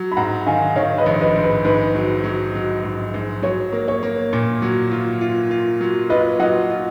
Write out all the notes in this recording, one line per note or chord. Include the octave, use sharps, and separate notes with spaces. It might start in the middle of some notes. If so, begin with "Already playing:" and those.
Already playing: F#3
B5
G#2 F#5 A#5
D#3 F5 G#5
D#3 C#5 F5
B4 D#5
A#1
B4 D#5
G#2
B4
G#2 B4
F#3
F#3
F#3
G#2
G#2
F#3 C#5
A#3
C#5
A#3
A#2
F#3
F4
F4
F4
F#3
F4 B4 D#5
F#3 D#5 F#5
F4